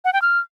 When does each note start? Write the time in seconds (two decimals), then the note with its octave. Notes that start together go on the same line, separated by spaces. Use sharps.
0.05 F#5
0.13 G5
0.22 F6